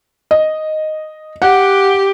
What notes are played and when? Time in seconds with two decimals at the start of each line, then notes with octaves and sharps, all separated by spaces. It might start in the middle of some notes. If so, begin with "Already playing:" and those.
0.31 D#5
1.42 G4 F#5